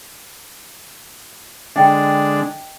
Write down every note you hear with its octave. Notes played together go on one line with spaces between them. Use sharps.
D3 G#3 D4 D#5 G5